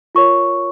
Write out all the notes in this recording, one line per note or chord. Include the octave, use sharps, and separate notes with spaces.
F4 A#4 C#5 C#6